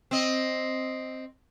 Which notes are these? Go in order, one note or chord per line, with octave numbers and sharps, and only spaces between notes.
C4 D#5